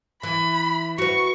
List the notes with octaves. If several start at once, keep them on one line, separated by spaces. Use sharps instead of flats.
E3 B5
F#4 B4 C#6